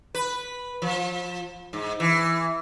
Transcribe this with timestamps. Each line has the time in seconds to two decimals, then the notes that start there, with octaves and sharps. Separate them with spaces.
0.15 B4
0.82 F3
1.73 G#2
2.00 E3